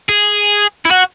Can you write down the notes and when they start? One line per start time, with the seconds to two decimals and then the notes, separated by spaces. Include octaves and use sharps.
0.09 G#4
0.85 E4
0.91 F#4